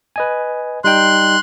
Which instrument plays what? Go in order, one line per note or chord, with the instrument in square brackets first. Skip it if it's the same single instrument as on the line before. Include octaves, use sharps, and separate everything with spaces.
[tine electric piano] B4 D#5 G#5
[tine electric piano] G3 D#4 G5 [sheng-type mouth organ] C6 F#6